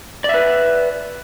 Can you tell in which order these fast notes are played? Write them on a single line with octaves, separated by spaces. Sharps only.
D5 E5 B4